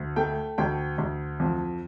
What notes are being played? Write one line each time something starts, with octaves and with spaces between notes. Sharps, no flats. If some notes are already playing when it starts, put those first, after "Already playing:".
Already playing: D2
A3 G5
D2 G5
D2
F2